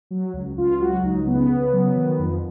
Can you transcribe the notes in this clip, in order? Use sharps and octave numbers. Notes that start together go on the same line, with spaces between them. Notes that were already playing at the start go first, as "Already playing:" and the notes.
F#3
C#2
C#2 F4
F#3 F#4
C#2 D#4
C#3 B3
C#3
F#3
D#3
F2